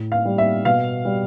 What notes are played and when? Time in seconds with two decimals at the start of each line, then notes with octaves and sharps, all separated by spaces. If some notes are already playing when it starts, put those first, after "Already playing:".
Already playing: A2
0.12 F5
0.25 G3
0.38 E5
0.65 B2 F5
1.05 G3